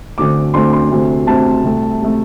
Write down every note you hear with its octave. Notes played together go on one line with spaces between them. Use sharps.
D2 D3 A3 C4 D6
D2 D3 A3 C4 C6
C6
D2 C3 A3 C4
D2 C3 A3 C4 A5
C2 C3 A3
C3 A3